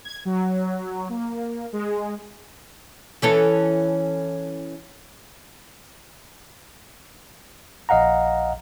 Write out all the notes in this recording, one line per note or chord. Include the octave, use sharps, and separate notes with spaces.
G#6
F#3
A#3
G#3
E3 C#4 A4
A#1 D#5 F5 F#5 A#5